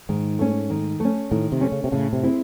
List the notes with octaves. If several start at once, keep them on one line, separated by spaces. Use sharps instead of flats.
G#2 D#3
A3 C#4
D#3
A3 C#4
A2 D#3
C3
A3 C#4
C#3
C3
A2 C#3
C3
G#3 C4 E4